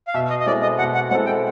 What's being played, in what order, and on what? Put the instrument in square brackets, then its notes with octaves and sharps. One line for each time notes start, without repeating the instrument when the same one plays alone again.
[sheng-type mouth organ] F5
[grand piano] B2 [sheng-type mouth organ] E5
[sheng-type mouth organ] D#5
D#5
[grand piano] G#3 C4 E4 A4 [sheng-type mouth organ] D5
[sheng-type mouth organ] D#5
[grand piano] B2 [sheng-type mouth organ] F#5
[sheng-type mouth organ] F#5
[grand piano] G#3 C4 E4 A4 [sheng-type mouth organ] F#5
[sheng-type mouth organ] G5